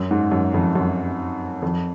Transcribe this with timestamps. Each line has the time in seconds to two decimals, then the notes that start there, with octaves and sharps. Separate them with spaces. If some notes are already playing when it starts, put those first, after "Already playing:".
Already playing: F#2
0.11 G#2
0.32 F#2
0.54 F2
0.75 F#2
1.62 F2